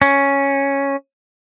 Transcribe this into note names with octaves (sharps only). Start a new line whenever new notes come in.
C#4